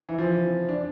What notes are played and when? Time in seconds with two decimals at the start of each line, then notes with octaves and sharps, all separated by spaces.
0.09 E3
0.18 F3
0.69 D4